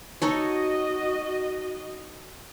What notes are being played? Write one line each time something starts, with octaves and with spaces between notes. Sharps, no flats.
D#4 F#4 A4 C#5 D#5